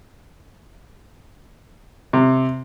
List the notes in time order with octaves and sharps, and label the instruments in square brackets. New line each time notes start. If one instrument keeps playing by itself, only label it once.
[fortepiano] C3